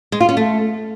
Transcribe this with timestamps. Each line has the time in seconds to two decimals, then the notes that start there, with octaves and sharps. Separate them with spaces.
0.12 G#3
0.20 F4
0.29 C#4
0.37 A3